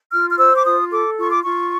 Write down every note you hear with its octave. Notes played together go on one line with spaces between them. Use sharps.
F4 F6
F6
C5 E6
D6
F4 D#6
A4 D6
F4 C#6
D6
F4 C#6